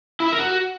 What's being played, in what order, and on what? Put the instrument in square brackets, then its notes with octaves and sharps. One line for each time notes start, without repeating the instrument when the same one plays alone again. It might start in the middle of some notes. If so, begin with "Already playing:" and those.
[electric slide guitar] E4
E5
A#4
F#4